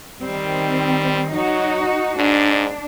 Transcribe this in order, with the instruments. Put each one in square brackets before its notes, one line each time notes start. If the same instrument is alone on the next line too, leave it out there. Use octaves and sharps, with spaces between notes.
[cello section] D#3 C4 [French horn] G3
[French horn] F#3 [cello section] D#4 F#4
[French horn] G#2 [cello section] D4